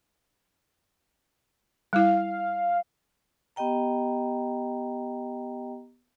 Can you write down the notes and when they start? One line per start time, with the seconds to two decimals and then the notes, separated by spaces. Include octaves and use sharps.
1.93 G3 E4 F5
3.56 B3 G4 D#5 G5 A#5